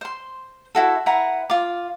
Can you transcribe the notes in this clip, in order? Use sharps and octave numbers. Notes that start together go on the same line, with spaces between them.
C5 C6
E4 F#4 A4
E4 B4 F#5 A#5
F4 D6